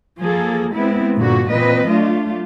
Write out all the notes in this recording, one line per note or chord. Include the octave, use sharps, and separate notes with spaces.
F3 A#3 G#4 A4
G#3 B3 C4 E4
G2 A#2 D3 F#4
A#2 E3 C4 B4 D#5
F#3 A3 D4 F4